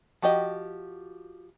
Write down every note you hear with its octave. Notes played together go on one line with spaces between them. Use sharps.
F3 F#4 G4 D#5